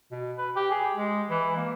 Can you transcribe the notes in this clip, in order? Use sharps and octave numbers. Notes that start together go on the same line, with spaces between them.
B2
B4
G4
G#4
G#3
E3
A#3